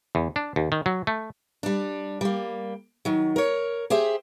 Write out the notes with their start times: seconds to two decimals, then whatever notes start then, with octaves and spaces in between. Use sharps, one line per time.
0.15 E2
0.36 D4
0.56 D#2
0.72 D#3
0.86 F#3
1.07 A3
1.63 G3 D4
2.21 G3 A#3
3.05 D#3 F#3
3.36 A#4 C#5
3.90 G4 G#4 C5 E5